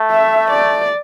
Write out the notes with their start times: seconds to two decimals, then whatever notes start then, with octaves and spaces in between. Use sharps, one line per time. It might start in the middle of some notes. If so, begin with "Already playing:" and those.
Already playing: A3
0.11 E5
0.51 D5